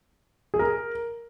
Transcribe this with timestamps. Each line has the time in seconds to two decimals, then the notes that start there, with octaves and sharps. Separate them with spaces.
0.54 G#4
0.59 A#4